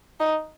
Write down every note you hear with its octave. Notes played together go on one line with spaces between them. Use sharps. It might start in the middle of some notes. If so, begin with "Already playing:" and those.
D#4